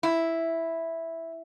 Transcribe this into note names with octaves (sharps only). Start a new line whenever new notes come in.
E4